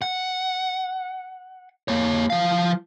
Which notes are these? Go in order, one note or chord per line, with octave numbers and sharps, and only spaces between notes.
F#5
A#3 C#5
F3 F5